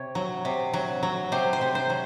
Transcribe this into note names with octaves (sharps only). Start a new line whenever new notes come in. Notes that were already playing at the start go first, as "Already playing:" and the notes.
Already playing: C3 C#5
F#3
C3
F#3
F#3
C3 C5
C5
C3
C5
F#3